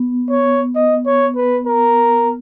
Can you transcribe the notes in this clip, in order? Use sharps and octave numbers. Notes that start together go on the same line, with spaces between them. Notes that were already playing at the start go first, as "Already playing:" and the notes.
Already playing: B3
C#5
D#5
C#5
B4
A#4